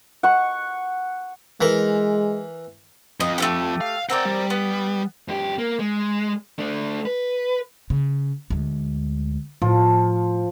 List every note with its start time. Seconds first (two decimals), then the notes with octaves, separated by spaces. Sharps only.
0.23 F#5 C#6
1.61 E3 G#3 A#4
3.20 F2 D#5
3.38 A3 C#4 G4
3.81 F5
4.10 C4 A#4 D5 F#5 G5
4.25 G3
4.50 B3
5.28 F#2 G4
5.59 A#3
5.79 G#3
6.59 A3 D4
7.05 B4
7.90 C#3
8.50 D2 G#3
9.62 A2 F3